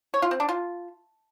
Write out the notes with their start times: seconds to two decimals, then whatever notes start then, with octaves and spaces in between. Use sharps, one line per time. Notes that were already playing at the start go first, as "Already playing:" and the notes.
0.14 C#5
0.22 F4
0.31 C4
0.40 D4
0.49 F4